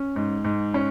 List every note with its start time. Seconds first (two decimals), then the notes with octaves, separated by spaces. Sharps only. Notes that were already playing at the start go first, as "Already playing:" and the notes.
Already playing: C#4
0.16 G#2
0.44 G#2
0.74 C#4